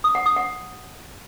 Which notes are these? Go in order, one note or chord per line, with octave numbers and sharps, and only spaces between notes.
D#6
F#5
D#6
F#5